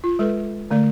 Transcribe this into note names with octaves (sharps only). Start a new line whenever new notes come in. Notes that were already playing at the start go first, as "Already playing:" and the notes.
F4
G#3 A4 B4
D3 A3 D5